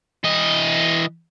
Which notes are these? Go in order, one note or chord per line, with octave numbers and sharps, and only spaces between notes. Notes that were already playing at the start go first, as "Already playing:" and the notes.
E3 D#5